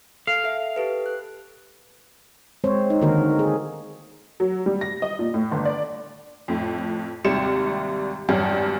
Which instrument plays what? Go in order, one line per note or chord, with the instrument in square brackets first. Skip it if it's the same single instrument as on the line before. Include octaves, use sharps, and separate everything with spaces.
[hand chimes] A4 [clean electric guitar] F5
[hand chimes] A4 E5
G4 A4 B4
F#6
[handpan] G#3 C4 C5 C#5
D#4
D3 D#3 A#3 F#4 A#4
G#4
[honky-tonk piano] F#3
G3
A#6
D#5
A#2
A2
G1
D5
F2 A2
G#1 D#2 C3 G3 C#7 E7
G#1 E2 G2 F#3 G3